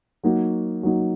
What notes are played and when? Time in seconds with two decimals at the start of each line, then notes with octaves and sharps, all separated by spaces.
0.23 F#3 A#3 D#4 F#4
0.83 F#3 A#3 D#4 F#4